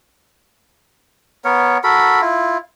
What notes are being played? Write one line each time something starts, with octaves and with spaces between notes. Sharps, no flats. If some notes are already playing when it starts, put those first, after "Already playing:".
B3 A#4 C#5
F#4 A4 A#4 B5
E4 F4